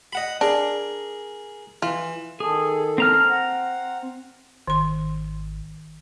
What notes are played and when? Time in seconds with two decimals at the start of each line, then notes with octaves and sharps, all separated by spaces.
0.13 D#5 F#5 B5
0.41 D4 G#4 A#4
1.82 E3 F4
2.40 D#3 G#4 A4
2.98 C4 A#5 F6
3.30 F#5
4.67 G#1 D#3 C6